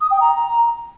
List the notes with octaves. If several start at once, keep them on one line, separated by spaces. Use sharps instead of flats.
D#6
G5
A#5